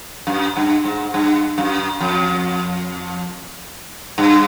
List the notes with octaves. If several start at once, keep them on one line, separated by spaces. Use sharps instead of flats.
F#2
G2
G#2
G2
F#2
F2
G2